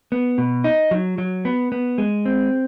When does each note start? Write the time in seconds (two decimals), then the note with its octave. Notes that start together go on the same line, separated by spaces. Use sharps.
0.12 B3
0.38 B2
0.64 D#4
0.91 F#3
1.18 F#3
1.45 B3
1.72 B3
1.98 G#3
2.26 C4